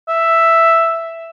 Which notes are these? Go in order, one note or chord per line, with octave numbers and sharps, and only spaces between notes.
E5